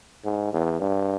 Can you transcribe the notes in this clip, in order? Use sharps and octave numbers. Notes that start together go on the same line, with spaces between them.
G#2
E2
G2